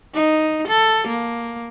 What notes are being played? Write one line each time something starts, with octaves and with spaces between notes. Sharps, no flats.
D#4
A4
A#3